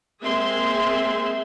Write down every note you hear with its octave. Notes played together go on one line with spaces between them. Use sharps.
G#3 A#3 C4 G#4 E5 C6